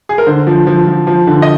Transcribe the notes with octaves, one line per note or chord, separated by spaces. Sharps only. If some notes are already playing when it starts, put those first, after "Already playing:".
G#4
A#4
D3 C5
F3
F3
F3
F3
D3
D#5